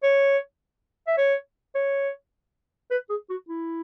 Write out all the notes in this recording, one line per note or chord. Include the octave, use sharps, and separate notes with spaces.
C#5
E5
C#5
C#5
B4
G#4
F#4
E4